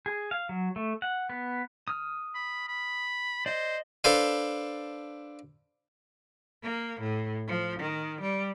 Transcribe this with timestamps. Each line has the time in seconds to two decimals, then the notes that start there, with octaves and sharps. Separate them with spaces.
0.06 G#4
0.31 F5
0.49 F#3
0.76 A3
1.02 F#5
1.30 B3
1.88 D#6 F6
2.35 B5
2.69 B5
3.46 C5 D5 D#5
4.04 D4 A4 B4 C5 F5
6.63 A#3
7.00 A2
7.48 F3
7.79 D#3
8.21 G3